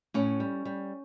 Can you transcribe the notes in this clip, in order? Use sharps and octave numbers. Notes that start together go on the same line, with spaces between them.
A2 C#4
G3
G3